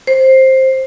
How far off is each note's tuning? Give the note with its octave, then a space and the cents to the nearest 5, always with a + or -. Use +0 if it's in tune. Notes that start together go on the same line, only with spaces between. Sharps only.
C5 +10